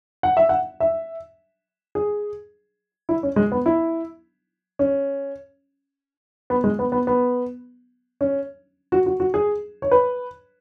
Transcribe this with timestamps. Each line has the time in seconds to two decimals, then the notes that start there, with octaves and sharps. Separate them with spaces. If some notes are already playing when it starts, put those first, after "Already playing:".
0.23 F#5
0.37 E5
0.49 F#5
0.80 E5
1.95 G#4
3.09 E4
3.23 C#4
3.36 G#3
3.52 B3
3.66 E4
4.79 C#4
6.50 B3
6.64 G#3
6.79 B3
6.92 B3
7.07 B3
8.21 C#4
8.92 F#4
9.06 F#4
9.20 F#4
9.34 G#4
9.82 C#5
9.91 B4